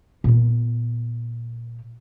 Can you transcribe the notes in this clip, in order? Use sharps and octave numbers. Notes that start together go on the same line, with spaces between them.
A#2 B3